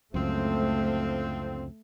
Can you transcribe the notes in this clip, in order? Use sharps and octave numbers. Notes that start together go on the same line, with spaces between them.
C#2 F#2 D3 F3 A3 C4